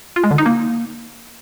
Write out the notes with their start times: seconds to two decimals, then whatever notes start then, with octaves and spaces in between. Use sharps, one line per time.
0.16 F4
0.24 G#3
0.31 D3
0.38 D#4
0.46 A#3